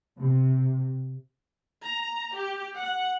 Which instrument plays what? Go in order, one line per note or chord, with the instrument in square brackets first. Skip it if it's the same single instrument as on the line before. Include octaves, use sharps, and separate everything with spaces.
[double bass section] C3
[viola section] A#5
G4
F#5